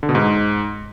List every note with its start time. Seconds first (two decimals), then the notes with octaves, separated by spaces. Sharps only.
0.03 D3
0.09 B2
0.15 G#2